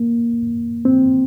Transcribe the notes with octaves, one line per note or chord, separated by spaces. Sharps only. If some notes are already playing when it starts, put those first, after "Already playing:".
Already playing: A#3
C4